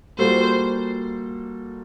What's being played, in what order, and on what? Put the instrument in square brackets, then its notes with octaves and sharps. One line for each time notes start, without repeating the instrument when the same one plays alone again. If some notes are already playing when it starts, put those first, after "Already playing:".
[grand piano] A#2 G3 A#3 F#4 A4 [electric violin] C5